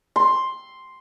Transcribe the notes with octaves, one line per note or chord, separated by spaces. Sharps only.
C6